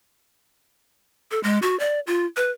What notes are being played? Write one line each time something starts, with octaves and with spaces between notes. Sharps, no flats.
A4
G#3
F#4
D5
F4
B4